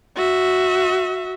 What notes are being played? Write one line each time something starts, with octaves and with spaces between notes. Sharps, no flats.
F#4 E5